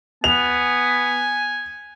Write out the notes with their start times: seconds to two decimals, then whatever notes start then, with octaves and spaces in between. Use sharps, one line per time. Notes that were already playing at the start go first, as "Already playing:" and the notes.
0.24 B3 G#5 F7